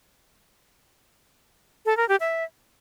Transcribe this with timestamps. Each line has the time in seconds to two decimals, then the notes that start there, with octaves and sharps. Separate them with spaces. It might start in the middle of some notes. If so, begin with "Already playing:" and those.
1.86 A4
1.97 A#4
2.09 G4
2.20 E5